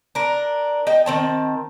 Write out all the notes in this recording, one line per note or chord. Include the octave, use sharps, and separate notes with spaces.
D4 A#4
D#4 G5
D#3 C4 A5